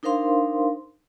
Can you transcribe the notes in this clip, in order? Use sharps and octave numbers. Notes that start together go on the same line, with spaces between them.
D4 D#4 A#4 C5 F5 C6